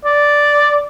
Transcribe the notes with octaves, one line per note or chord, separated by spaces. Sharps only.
D5